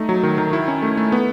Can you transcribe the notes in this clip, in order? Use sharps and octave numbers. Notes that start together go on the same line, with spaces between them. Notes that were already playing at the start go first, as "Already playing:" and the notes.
Already playing: A3 D#4
F#3
D#3
D#3
E4
C#4
A3
A3
B3